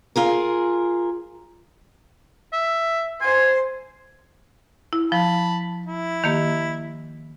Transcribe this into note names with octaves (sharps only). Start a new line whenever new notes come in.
F4 G#4 A#4
E5
C5 G#5 C6
E4
F3 A5 B5
E4
D#3 A#3 G4